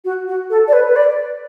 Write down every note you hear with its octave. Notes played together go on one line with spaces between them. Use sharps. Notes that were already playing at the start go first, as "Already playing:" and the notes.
F#4
F#4
A4
D5
B4
B4
D5